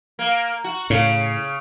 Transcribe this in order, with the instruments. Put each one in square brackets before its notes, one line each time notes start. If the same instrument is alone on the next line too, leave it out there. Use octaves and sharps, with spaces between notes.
[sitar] A#3
F#4
[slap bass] A2 [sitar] C#3